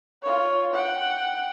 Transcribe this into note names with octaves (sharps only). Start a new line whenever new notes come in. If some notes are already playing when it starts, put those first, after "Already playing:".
F4 C#5
F#5 G5